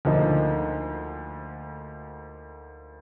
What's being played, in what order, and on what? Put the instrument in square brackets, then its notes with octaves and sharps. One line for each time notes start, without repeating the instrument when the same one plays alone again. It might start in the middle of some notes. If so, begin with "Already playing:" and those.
[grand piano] D2 D3 F3 A#3 D#4